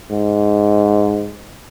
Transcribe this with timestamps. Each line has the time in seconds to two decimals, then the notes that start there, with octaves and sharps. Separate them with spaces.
0.11 G#2